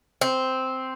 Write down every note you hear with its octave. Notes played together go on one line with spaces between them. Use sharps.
C4